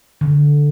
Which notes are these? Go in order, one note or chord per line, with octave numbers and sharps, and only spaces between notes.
D3